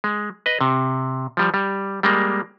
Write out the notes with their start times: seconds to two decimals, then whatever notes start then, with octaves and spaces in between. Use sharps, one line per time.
0.04 G#3
0.46 B4 D#5
0.61 C3
1.37 F3 G3
1.54 G3
2.03 G3 G#3 A#3